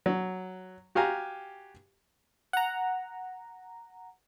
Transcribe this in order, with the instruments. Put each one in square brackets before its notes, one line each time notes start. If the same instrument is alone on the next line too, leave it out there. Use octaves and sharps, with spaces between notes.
[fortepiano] F#3
F#4 G4 F5 G#5 A#5
[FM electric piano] F#5 A#5